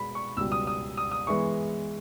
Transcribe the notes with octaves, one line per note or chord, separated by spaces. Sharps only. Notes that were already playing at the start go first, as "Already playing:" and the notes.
Already playing: B2 G#3 B3 B5
C#6
C#2 B2 G3 E6
D#6
D#6
D#6
D#6
E3 G#3 B3 C#6